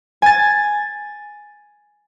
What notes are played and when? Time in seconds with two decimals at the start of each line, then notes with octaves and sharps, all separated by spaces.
0.22 G#5 A6